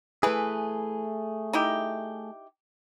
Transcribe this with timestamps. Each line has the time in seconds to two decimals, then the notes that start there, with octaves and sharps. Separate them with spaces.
0.23 E3 A3 G#4 B4
1.53 D#4 E4 G4